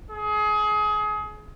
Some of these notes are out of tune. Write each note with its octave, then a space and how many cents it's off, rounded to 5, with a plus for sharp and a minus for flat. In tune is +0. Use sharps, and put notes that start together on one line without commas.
G#4 +25